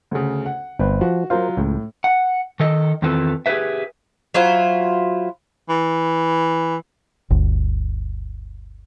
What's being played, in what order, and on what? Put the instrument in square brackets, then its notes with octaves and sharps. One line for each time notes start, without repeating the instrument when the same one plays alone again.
[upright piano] D2 C#3
F#5
[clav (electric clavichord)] G1 [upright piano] C4 B4
[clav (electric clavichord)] F3 [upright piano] F#4
[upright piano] F#3 F4 [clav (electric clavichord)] A#4 C5 F5
[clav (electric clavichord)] C#2 [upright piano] A2
[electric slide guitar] F#5
D#3 A4 D#5
E2 D#3 C4 F4 A4 B4
G4 G#4 A#4 B4 E5
[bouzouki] F#3 E4 F4 C5
[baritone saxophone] E3
[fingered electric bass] G1 D2